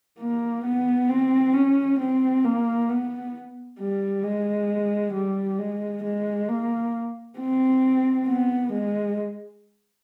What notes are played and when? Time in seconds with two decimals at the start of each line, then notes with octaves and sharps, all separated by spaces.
0.19 A#3
0.65 B3
1.09 C4
1.54 C#4
1.99 C4
2.44 A#3
2.89 B3
3.79 G3
4.23 G#3
5.14 G3
5.58 G#3
6.03 G#3
6.49 A#3
7.39 C4
8.28 B3
8.73 G#3